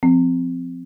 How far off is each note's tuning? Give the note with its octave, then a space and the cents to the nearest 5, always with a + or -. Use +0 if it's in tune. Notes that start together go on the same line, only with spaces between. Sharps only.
F3 +0 C4 -15